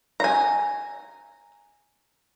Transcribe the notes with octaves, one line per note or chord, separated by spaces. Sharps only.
G#5 A#5